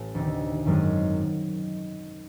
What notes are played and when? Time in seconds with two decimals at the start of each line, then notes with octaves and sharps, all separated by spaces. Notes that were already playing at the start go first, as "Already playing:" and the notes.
Already playing: A1 A3
0.15 D2 C3 D#3
0.66 G#1 F#2 D#3 G#3